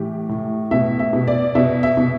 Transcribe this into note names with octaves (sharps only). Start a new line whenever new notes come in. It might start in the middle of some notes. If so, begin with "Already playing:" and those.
Already playing: A2 E3 G4
A2
B2 E5
E5
B2
D5
B2 E5
E5
B2